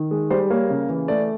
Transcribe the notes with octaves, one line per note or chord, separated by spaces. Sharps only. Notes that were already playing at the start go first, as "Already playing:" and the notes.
Already playing: D#3
G#3
G3 C5
A#3 C#5
C#3
E3
A3 D5